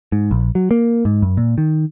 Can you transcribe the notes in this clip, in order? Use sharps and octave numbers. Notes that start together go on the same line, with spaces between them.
G#2
A#1
F#3
A#3
G#2
F#2
A#2
D#3